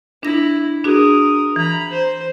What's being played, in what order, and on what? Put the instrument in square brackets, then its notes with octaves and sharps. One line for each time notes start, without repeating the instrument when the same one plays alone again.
[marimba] D4 A#6 [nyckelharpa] E4
[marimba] D4 F#4 G#4 [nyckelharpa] A#4 D#6
[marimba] E3 [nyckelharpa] A#5 B5
[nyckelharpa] C5